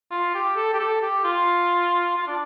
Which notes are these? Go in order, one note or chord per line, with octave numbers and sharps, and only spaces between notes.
F4
G4
A4
G4
A4
G4
F4
F4
D4